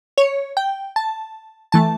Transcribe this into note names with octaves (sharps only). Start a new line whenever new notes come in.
C#5
G5
A5
E3 A3 A5